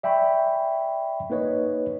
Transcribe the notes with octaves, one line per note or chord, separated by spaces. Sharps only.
D5 E5 G5 G#5 B5 C#6
A#3 D#4 B4 C#5 D#5